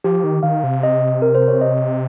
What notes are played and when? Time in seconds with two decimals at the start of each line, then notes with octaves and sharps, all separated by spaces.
0.04 F3 G4
0.24 D#3
0.43 D#3 F5
0.64 C3
0.83 D#5
1.22 A#4
1.35 C5
1.48 C#5
1.61 D#5